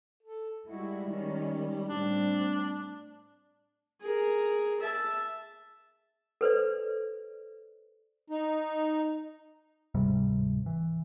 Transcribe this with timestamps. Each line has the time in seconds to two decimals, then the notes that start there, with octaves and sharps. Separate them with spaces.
0.23 A4
0.66 G3 G#3 E4 F#4
1.10 D#3 G#3 C#4
1.88 A2 G3 C4 D4
4.01 G#4 A#4
4.81 E5 A5
6.41 A4 B4 C5 D5
8.30 D#4
9.95 D1 G#2 C3 G3
10.66 E3